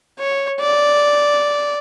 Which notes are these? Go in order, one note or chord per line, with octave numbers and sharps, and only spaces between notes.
C#5
D5